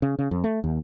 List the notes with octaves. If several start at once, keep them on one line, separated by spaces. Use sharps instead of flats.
C#3
C#3
F2
A3
D#2